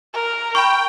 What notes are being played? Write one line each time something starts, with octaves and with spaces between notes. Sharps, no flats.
A#4
G5 B5 C#6